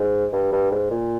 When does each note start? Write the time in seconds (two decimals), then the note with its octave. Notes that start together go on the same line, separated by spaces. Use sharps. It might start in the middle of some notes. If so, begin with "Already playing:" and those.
Already playing: G#2
0.33 G2
0.52 G2
0.71 G#2
0.91 A#2